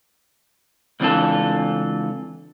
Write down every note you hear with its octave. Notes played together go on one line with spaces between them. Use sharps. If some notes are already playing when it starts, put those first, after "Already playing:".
C#2 E3 C4 D4 F4 A4